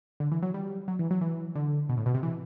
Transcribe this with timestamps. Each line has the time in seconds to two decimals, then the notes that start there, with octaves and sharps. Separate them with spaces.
0.20 D3
0.32 E3
0.43 F#3
0.54 G3
0.88 F#3
0.99 E3
1.11 F#3
1.21 E3
1.55 D3
1.89 B2
1.97 A2
2.06 B2
2.14 C3
2.23 E3